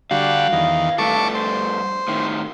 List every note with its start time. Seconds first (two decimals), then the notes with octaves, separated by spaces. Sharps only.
0.11 D3 G3 F#4 F5
0.53 E2 D#3
0.98 G2 A3 A5 C#6 D6
1.35 C5
2.08 A2 D#3